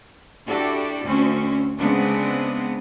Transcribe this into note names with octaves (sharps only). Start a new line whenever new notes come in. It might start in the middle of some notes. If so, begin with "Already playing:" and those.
D4 E4 F#4 G4 A4 D5
D2 C4 C#4
C#3 G#3 B3 C4 D4